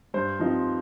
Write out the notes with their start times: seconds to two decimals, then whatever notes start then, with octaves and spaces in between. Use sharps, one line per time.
0.14 G2 C5
0.39 F3 C4 D#4